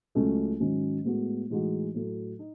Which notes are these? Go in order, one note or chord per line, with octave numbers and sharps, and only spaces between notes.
C#2 C#3 F#3 A3 C#4
G#2 D#3 F#3 C#4
A2 G#3 B3 F#4
A2 E3 G#3 D#4 F#4
A2 F#3 A3
D#4